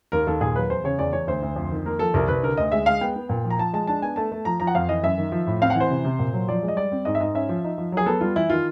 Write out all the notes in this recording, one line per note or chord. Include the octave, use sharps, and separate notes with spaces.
D#2 A#4
D#2 A4
A#2 G#4
F#3 B4
E2 C5
C#3 C#5
E2 D5
E2 C#5
D2 C5
D2
F2
D#3
A#3 A#4
F3 A4
C2 A#4
C2 B4
D3 A#4
D2 D#5
G#3 E5
G#3 F5
B3 G5
B3
A#2
F3
A#5
F3 A5
G#3 A5
D4 A5
B3 G#5
A3 A5
A3
F3 A#5
F3 A#5
F#5
F2 F5
E3 D#5
F#2 E5
D#3
F3
A2
C4 F5
E3 F#5
C5
C3
C3
A#2
F#3
F3 D5
G#3
D#5
G3 D5
C4
G#2 D#5
E5
G#2 D#5
C#4 E5
F3
D#4
F3
F#3 G#4
B3 A4
G3 F4
E3 E4
D#3 F4